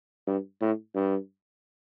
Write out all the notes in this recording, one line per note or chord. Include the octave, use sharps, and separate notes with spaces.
G2
A2
G2